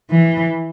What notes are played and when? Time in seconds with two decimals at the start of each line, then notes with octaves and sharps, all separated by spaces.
0.11 E3